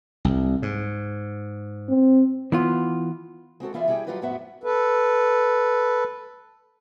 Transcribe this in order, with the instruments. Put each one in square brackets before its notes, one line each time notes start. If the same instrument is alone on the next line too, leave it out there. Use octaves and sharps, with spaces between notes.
[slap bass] C2
G#2
[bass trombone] C4
[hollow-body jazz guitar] E3 B3 F4
[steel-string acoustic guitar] G#3 C4 F#4 A4
E3 E4 F4 G#4 D5 E5
G3 E4 G4 G#4 G5
F#3 G3 F4 G4 B4 D#5
F2 A2 B3 F#4 E5
[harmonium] A4 B4